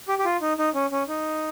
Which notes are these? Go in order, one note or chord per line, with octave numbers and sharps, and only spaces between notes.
G4
G4
F4
D#4
D#4
C#4
C#4
D#4